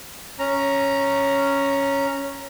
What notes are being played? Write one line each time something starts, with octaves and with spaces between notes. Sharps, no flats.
C#4 A#5